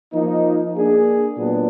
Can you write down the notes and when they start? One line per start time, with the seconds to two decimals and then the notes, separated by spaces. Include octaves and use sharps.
0.13 F3 A#3 D#4
0.74 A#3 D4 G#4
1.38 A#2 F#3 B3 D4